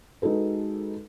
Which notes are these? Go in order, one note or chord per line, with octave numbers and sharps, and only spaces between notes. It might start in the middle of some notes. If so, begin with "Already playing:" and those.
G#3 D#4 F#4 A4 B4